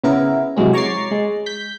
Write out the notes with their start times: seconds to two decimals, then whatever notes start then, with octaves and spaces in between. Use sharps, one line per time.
0.04 C#3 B3 E4 A#4
0.57 C3 E3 F#3 G#3 C#4
0.73 C#5 A#5 C#6 D6 A6 C7
1.11 G#3
1.46 G6 B6